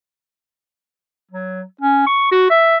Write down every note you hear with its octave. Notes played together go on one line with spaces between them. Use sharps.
F#3
C#4
C#6
F#4
E5